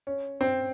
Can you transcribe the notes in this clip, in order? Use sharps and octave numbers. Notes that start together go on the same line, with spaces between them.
C#4
C4